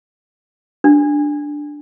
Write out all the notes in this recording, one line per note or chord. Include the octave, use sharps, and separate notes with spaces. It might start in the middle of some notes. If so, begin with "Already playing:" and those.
D4